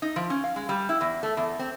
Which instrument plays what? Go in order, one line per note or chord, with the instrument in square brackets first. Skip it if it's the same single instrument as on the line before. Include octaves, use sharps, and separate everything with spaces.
[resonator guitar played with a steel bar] D#4
F3
C#4
F5
G#3
G3
E4
E2
A3
E2
C4